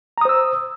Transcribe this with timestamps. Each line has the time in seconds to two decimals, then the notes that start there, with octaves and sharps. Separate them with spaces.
0.18 A#5
0.21 D#6
0.25 C5
0.29 E6